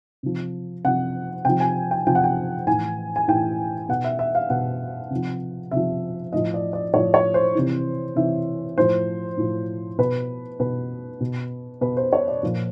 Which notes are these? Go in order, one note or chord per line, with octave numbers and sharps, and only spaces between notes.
C3 F3
C3 F3 F#5
C3 F3 G5
G#5
G5
C3 F3 G5
F#5
G5
A2 E3 G#5
G#5
A2 E3 G5
B2 F#5
E5
E5
F5
B2 F#5
C3 F3
C3 F3 E5
A2 F3 D#5
D5
D5
A2 F3 C#5
C#5
C5
C3 E3
C3 E3 E5
A2 F3 C5
A2 F3
B2 B4
B2 B4
B2
B2 B4
C5
C#5
D5
A#2 F3